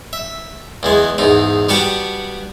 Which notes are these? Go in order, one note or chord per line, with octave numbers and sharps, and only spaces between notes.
E5
E2 E3 G#3
E2 G#2 D#4
G3 B3 F#4 A5 C#6